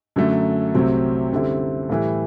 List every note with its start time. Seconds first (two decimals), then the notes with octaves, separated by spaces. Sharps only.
0.16 F#2 D3 F#3 A3
0.74 C2 C3 F#3 A3 C4
1.31 F#2 D3 G3 C4 E4
1.89 A2 E3 G3